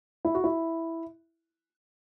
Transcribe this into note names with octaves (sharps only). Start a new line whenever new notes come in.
E4
F#4
E4